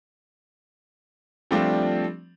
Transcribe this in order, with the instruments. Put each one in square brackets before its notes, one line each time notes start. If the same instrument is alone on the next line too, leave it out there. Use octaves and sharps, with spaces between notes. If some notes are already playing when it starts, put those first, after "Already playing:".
[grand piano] F3 G3 A3 C4 D4 F4